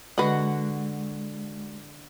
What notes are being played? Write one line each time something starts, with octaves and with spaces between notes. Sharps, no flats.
D3 G#3 F#4 B4 D#5 F#5